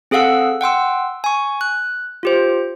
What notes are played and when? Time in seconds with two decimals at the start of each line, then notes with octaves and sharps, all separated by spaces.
0.11 C4 G#4 A4 F5 F#5 E6
0.61 F#5 G5 C6 E6
1.24 G#5 C#6
1.61 F#6
2.23 F4 G4 C5